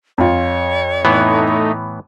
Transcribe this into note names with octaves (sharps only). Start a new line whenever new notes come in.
F2 F4 C#5
A2 E3 A3 B3 D#4